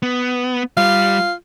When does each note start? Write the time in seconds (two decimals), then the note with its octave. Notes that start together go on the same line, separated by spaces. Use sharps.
0.02 B3
0.77 G3 F4